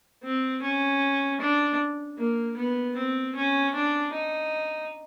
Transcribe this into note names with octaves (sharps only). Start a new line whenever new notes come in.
C4
C#4
D4
A#3
B3
C4
C#4
D4
D#4